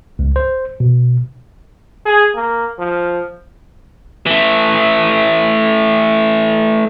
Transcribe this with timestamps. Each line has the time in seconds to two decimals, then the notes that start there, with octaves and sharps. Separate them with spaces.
0.19 C#2
0.36 C5
0.80 B2
2.06 G#4
2.35 A#3
2.79 F3
4.26 E3 A3